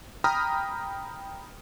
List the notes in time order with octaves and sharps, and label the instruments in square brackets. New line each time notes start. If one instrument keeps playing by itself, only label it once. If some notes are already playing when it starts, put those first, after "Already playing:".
[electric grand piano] G5 A#5 B5 D#6 F6